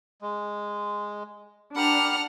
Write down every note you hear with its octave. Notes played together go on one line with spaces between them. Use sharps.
G#3
D4 G4 A#4 F#5 B5 F6